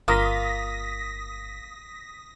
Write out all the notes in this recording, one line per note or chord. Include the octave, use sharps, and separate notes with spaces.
G1 A#3 F4 D#6 A#6 B6